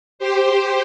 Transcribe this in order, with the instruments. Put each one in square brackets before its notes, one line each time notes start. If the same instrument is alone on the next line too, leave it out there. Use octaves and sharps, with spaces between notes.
[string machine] G4 C5